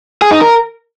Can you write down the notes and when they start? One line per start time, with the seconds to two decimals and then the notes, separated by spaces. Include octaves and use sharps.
0.22 G#4
0.32 D#4
0.41 A#4